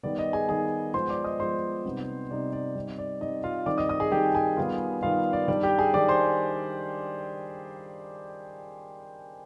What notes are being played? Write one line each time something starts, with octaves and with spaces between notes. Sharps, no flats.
D#3 G3 B3 D5
D#5
G#4 G#5
D#3 G3 B3 G#4 G#5
F3 G#3 B3 C5 C6
D5 D6
D#5 D#6
F3 G#3 B3 C5 C6
C3 G3 B3 D#4
C3 G3 B3 D#4 D5
D5
G3 C4 D#4
D5
G3 C4 D#4 D#5
F4 F5
D#3 G3 C4 D#4 D5 D6
D#5 D#6
D#5 D#6
G#4 G#5
D#3 G3 C4 D#4 G4 G5
G#4 G#5
D#3 G3 B3 F4
D#3 G3 B3 F4 F5
D5
D#3 G3 D4 D5
G4 G5
G#4 G#5
D#3 G3 D4 D5 D6
C5 C6